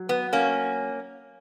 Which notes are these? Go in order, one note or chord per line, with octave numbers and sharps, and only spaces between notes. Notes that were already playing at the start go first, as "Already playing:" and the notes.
Already playing: F#3
B3
A#3 C#4